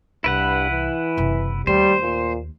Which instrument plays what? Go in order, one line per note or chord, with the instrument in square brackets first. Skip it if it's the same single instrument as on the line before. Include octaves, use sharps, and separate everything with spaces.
[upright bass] C2 [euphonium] G2 [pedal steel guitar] E4 B4 F#5
[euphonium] E3
[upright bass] F#1 C3
[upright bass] D#2 A3 [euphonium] G3 [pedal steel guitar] C5
[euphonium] A#2